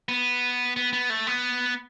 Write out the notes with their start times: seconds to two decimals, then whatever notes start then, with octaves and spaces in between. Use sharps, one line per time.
0.09 B3
0.76 B3
0.93 B3
1.10 A3
1.27 B3